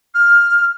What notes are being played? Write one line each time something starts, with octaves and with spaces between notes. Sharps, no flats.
F6